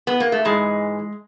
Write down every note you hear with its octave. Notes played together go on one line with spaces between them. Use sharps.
B3
A#3
A3
G#2 E3 G#3